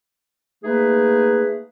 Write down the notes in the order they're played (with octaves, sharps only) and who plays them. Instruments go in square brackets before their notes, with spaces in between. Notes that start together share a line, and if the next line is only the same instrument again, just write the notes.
[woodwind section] A3 A#3 D#4 G#4 B4